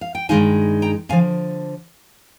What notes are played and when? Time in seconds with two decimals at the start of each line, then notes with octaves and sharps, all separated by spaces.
0.01 F5
0.15 G5
0.29 G2 D#3 G#3 D#4 F5 G#5
0.82 G5 A#5
1.09 F2 D3 F3 F5 G#5